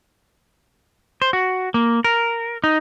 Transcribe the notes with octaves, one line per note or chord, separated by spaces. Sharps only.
C5
F#4
A#3
A#4
D#4